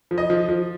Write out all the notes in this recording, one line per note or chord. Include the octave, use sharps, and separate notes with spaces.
F3
D#5
F3
F3